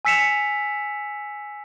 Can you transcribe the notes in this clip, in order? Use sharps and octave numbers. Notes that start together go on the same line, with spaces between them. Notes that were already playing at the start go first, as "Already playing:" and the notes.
G#5 E6 B6 C#7 E7 F7